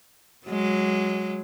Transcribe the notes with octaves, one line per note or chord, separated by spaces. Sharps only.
F#3 G#3